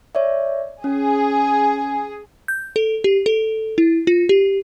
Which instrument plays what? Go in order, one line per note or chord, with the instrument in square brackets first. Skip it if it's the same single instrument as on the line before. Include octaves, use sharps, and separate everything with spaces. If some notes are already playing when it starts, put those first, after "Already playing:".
[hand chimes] C#5 D5 E5
[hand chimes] C#4 [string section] G#4
[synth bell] G6
A4
G4
A4
E4
F4
G4